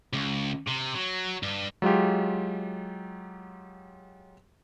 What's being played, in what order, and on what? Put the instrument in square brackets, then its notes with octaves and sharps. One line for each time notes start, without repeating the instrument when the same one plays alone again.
[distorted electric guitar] C#2
C3
F#3
G2
[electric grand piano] F#3 G#3 F4 G4